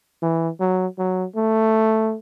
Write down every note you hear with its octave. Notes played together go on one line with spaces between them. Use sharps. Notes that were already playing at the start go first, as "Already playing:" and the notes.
E3
F#3
F#3
A3